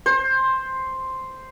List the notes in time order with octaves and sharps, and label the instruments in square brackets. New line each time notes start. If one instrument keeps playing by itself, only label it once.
[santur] C5